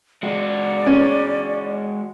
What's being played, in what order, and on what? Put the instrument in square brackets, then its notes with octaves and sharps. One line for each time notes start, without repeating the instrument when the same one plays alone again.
[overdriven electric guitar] G#3 F#4 [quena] D5
[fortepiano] C#4